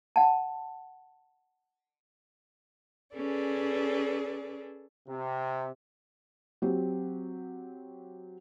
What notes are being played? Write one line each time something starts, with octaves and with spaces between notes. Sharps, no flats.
F#5 A5
C#4 G#4 A4 B4 D5
C3
F#3 C4 G4